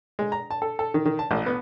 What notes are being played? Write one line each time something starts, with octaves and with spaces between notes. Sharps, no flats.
G#3
A#5
A5
A4
A4
D#3
D#3
A5
A1
B3